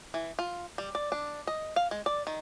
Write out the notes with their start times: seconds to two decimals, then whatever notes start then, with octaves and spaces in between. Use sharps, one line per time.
0.14 E3
0.39 F4
0.78 G3
0.95 D5
1.12 D4
1.47 D#5
1.76 F5
1.91 G#3
2.06 D5
2.27 D#3